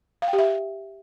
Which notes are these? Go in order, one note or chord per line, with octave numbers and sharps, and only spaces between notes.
F5
G5
G4
E5